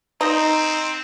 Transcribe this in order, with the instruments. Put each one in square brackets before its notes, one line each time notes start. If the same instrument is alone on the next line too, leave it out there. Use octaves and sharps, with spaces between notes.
[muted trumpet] C4 [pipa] D#4